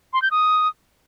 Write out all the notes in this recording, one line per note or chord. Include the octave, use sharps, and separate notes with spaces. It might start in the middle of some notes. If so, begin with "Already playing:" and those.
C6
G6
D#6